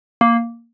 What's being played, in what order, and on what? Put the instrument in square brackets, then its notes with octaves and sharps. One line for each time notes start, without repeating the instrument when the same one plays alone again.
[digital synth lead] A#3